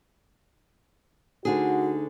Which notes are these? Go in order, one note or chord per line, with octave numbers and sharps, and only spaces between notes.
D2 D3 D#4 F#4 G#4